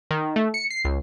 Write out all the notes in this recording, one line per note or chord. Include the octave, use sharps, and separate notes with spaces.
D#3
A3
C#7
C7
C#2